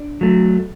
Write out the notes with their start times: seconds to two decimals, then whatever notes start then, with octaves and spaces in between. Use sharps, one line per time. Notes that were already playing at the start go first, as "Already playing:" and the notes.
Already playing: D4
0.21 F#3 A3